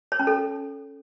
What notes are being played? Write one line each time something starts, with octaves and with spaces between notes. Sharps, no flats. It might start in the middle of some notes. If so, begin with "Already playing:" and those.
C#5
C#4
A4